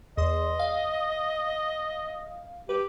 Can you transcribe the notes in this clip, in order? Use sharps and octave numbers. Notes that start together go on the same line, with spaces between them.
E2 D#5 C6
F5
G4 B4